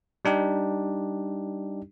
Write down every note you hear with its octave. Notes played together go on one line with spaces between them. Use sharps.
G3 D4 D#4 G4